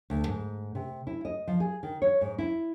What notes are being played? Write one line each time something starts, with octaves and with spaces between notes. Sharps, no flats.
D2
G#2
C3
E4
D#5
F3
G#4
D#3
C#5
G#2
E4